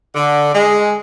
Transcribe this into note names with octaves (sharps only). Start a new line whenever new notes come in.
D3
G#3